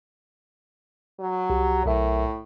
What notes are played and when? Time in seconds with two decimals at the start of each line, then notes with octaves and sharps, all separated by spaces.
1.20 F#3
1.50 C2 G4
1.86 B1 A2 A#4 E5